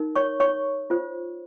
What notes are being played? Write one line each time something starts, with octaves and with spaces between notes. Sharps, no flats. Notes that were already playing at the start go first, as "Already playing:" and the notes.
Already playing: D#4 A#4
C#5 C#6
C#5 C#6
F4 C5